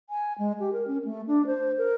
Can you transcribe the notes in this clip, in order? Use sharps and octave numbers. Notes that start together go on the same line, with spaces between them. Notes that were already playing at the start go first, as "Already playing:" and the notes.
G#5
G#3
G4
A#4
C#4
A3
D4
C5
A#4